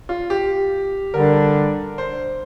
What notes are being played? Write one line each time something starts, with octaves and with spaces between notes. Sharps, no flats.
F4
G4
D3 G3 D4 A#4
C5